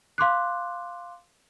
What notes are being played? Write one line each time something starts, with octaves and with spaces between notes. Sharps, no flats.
F5 C6 D6 F#6